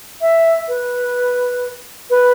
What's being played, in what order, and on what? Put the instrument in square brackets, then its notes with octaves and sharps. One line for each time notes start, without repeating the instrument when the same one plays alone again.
[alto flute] E5
B4
B4